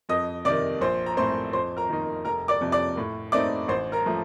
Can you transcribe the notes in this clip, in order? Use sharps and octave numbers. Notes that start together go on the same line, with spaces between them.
F2 D#5 D#6
C3 D#3 D5 D6
A#1 C5 C6
A#5
A2 A3 C4 C5 C6
F2 C5 C6
A#4 A#5
D#3 A#3 D#4
F1 A#4 A#5
D5 D6
F2 C3
D5 D6
A2
A3 C4 D#4 D5 D6
A1 C5 C6
A#4 A#5
F3 A3